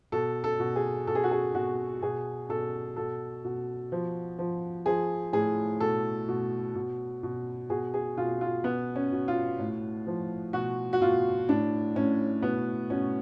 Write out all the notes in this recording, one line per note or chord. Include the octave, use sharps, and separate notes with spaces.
B2 A4
A4
B2
G#4
B2 A4
G#4
F#4
G#4
B2 F#4
B2 G#4
B2 A4
B2 A4
B2
F3
F3
F3 G#4
A2 G#4
B2 A4
B2
B2
B2
B2 G#4
G#4
B2 F4
F4
B2 B3
C#4
B2
F4
A2
F3
B2 F#4
F#4
B2 F4
A2 D4
A2 C#4
B2 B3
B2 C#4